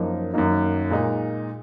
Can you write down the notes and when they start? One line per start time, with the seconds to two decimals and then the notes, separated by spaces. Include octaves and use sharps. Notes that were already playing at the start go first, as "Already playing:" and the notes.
Already playing: F#2 F3 A#3 D#4
0.34 F#2 D#3 A#3 D#4
0.90 A#2 G#3 D#4